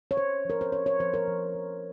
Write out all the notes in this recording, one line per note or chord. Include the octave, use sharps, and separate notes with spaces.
C#5
C#4 C5
F3 A#4
C5
C#4 C#5
C#5
F3 C5
A#4
F3
F3